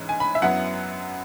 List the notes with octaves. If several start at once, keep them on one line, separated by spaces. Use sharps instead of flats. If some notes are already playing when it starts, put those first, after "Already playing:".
Already playing: G#2 E3 C#4
G#5
B5
E5
F#2 F#3 B3 E4 F#5